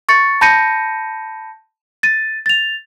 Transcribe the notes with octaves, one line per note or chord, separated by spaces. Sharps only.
C#6 A6 C#7
A5 B5 G6 A#6 C#7 D#7
A6 D#7
A6 F7